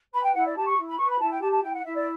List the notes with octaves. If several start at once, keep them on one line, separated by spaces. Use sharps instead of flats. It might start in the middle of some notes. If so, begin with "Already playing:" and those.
B4 B5
G5
E4 F#5
D5
G4 A5
C#6
E4
B5
B4 C#6
B5
E4 A5
G5
G4 A5
A5
E4 G5
F#5
E4 E5
D5